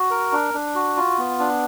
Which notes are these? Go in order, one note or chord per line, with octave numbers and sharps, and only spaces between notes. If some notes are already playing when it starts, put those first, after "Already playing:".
Already playing: F#4
A#4
D4
D4
F#4
F4
B3
D4